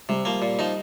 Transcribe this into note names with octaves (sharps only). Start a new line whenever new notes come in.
C3 G3
F3 A#3
A#2
F3 D#4